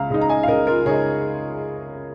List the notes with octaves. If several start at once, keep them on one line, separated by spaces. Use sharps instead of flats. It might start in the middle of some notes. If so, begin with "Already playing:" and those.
Already playing: C#2 F5 A#5
C#3 G#3 D#4
A#5
D#5 G#5
F5
C#2 A#4 D#5
F4 A#4
C#3 G#3 D#4 G#4 C#5